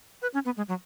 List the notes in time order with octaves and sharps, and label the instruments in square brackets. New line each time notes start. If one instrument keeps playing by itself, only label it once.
[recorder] B4
C#4
B3
G#3
F#3